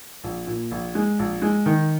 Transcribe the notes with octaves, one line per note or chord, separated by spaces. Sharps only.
A#1
A#2
A#1
G#3
A#1
G#3
D#3